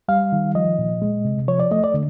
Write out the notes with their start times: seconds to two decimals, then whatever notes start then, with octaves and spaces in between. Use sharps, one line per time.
0.08 G3 F5
0.32 D#3
0.55 F3 D#5
0.79 A#2
1.02 G#3
1.25 C3
1.48 F3 C#5
1.60 D5
1.71 A3 D#5
1.84 D5
1.94 D3